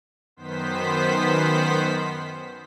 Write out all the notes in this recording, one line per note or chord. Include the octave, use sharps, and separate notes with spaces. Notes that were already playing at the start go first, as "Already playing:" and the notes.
F#2 D#3 B3 C5 B6